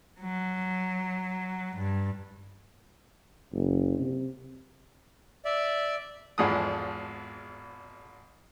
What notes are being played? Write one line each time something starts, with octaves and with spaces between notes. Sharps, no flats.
F#3
G2
F#1
C3
D5 E5
G#1 E2 G#2 F3 A4 D#6